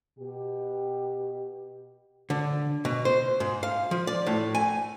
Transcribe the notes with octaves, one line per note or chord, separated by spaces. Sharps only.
B2 G4
D3
B2
C5
G#2
F5
F3
D5
A2
G#5